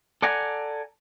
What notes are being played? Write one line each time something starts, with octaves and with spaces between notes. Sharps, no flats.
A4 D5 F#5 G#5 A#5